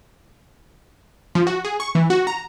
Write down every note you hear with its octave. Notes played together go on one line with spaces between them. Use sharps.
F3
F#4
G#4
C#6
E3
F#4
A#5